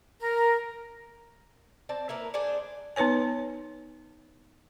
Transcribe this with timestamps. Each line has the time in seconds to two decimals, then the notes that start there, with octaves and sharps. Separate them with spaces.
0.20 A#4
1.89 C4 D5 A5
2.09 A#3 E4 A#4 B4
2.34 D4 G#4 C5 D5
2.96 B3 D#4 B4 C#5 G#5